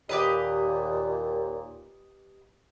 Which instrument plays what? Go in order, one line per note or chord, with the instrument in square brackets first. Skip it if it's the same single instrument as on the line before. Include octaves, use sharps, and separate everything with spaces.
[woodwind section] D#2 A#2 [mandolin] G4 B4 D#5